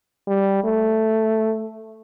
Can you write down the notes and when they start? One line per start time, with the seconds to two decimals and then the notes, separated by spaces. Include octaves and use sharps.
0.27 G3
0.64 A3